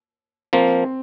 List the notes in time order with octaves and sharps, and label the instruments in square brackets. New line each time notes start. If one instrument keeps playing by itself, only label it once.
[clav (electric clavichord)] F3 A#3 [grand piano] C4